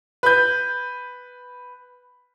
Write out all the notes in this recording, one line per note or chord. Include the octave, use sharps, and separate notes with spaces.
B4 G6